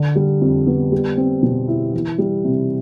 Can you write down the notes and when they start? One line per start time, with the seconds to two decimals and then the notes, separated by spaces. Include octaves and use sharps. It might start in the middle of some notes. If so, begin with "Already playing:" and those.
Already playing: D3 D4
0.16 G3
0.41 F2
0.67 B3
0.92 G3
1.17 C4
1.43 B2
1.68 E4
1.93 E3
2.18 G3
2.45 C3